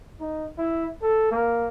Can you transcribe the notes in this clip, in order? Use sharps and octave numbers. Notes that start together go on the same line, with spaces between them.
D#4
E4
A4
A#3